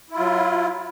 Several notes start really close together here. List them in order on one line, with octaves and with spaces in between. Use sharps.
E4 F4 F#3